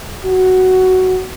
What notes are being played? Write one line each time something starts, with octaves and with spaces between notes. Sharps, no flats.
F#4